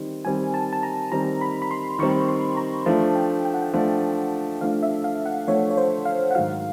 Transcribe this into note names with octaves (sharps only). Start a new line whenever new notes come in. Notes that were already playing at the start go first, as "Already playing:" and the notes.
Already playing: D#3 G3 C4
D#3 G3 C4 G#5
A5
A5
A#5
D#3 G3 C4 A#5
B5
B5
C6
D#3 G3 C4 C#6
C6
A#5
F3 A3 D4 A5
G5
G5
F#5
G5
F3 A3 D4
F3 A3 D4 F5
E5
F5
F#5
F3 A3 D4 C#5
C#5
C5
F5
F#5
G#2 D#3 F#3 F5